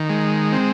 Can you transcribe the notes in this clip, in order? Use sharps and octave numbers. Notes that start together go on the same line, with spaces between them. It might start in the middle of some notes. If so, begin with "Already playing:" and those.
Already playing: D#3
G#3
C4